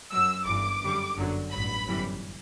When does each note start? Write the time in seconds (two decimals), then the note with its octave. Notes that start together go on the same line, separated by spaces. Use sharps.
0.11 F#2 F#3 E6
0.46 G1 G2 E3 D6
0.81 F#2 D3 G3
1.17 G1 F#2 D3 F#3
1.51 A1 G2 F#3 B5
1.85 G1 F#2 E3 G3